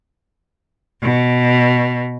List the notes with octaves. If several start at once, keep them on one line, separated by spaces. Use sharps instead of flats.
B2